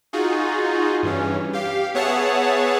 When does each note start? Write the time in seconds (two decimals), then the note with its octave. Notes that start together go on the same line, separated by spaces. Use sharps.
0.13 D#4 F4 F#4 G#4
1.03 G2 E3 C#4
1.53 G4 F5
1.94 B3 G#4 C#5 E5 F#5 A5